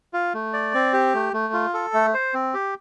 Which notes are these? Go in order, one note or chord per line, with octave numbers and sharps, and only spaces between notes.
F4
A3
D5
C4
G4
A3
A3
F4
A4
A3
C5
C4
G4